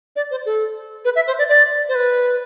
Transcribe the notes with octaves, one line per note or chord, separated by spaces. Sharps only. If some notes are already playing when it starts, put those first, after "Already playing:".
D5
C5
A4
B4
E5
C5
D5
D5
C5
B4